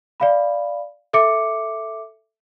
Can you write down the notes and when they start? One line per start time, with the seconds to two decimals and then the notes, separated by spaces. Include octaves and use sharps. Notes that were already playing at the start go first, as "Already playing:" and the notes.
0.20 D5 F5 B5
1.13 A4 E5 D6 C#7